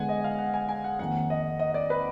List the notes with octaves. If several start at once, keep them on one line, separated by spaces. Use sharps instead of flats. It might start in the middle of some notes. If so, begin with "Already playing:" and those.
Already playing: D3 G#3 B3 F#5 G#5
D#5
F5
F#5
G#5
G#5
F#5
F2 D#3 A#3 F#5
D#5
D#5
D5
B4